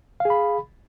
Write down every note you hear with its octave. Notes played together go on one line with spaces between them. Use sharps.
G#4 F5 B5